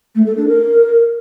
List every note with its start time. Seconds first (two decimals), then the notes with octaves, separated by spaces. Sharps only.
0.15 A3
0.26 A4
0.37 D4
0.47 A#4